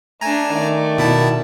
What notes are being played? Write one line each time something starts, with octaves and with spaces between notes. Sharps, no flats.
A3 D4 G#5 A#5
D#3 A3 D5
B2 E4 A5